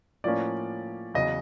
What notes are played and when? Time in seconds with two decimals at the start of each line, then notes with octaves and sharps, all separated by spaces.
0.24 A2 F3 A#3 C#4 D5
1.14 E2 C#3 F#3 D#5